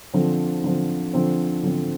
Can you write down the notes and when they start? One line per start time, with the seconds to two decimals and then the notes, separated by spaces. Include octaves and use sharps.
0.14 D3 F3 C4
0.64 D3 F3 C4
1.13 D3 F3 C4
1.63 D3 F3 C4